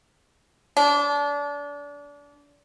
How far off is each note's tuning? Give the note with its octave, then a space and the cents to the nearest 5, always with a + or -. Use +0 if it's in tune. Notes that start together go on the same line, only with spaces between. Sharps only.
G#3 +35 D4 -30